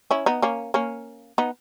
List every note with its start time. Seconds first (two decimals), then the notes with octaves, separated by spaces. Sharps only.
0.11 C#4 E4
0.26 B3 D#4
0.42 A#3 C#4
0.74 A#3 C#4
1.38 B3 D#4